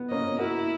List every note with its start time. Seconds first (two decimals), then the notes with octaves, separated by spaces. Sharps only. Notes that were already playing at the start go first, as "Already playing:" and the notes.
Already playing: B3
0.10 A#3 C#4 D#5
0.39 E4 F#4 A#4